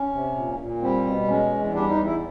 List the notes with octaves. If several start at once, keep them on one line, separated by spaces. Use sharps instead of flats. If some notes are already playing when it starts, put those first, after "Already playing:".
Already playing: C#4
C3
A#2
A#2
G3 C4
B2
G#3 C#4
E2
G3 D4
D#4
E2
E4